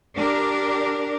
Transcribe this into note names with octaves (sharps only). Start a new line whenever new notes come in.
D4 G4 A#4